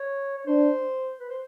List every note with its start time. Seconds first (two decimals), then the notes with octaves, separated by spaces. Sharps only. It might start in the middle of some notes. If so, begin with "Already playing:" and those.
Already playing: C#5
0.37 C#5
0.47 D4 C5
1.20 B4
1.30 C5